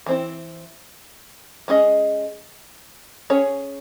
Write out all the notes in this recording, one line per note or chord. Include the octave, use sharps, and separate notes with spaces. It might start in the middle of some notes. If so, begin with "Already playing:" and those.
E3 C4 E4
G#3 C#4 G#4 D#5
C#4 G#4 C#5